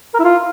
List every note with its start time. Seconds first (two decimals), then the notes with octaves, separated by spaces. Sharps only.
0.14 A#4
0.19 E4
0.24 F4